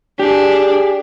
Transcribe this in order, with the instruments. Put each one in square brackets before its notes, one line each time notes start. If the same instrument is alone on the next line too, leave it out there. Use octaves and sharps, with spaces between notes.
[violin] D4 [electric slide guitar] G4 G#4